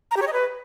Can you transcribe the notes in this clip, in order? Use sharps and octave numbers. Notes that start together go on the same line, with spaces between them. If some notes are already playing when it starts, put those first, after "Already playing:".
A#5
G4
C#5
D#5
B4